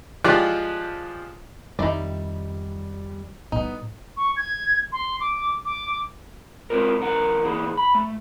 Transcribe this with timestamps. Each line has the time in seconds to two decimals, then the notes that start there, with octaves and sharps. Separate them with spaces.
0.24 F3 G#3 F4 G4 D5 F#6
1.79 F2 D#3 G3 D#4 E4 D5
3.52 A2 G3 B3 D#4
4.17 C#6
4.37 G#6
4.92 C6
5.20 D6
5.65 D6
6.70 G#3 C4 E4 F4 A#4
7.00 B1 E3 A#4 F#5
7.44 E3 A#3 E4 G#4
7.77 B5
7.95 A3